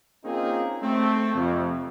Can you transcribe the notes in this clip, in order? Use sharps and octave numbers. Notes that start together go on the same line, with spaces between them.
A#3 C4 C#4 D#4 F4 G#4
A3 C4
F2 C3